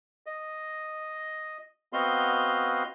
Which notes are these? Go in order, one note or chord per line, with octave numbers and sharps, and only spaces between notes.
D#5
B3 C4 F#4 D#5 F5 C6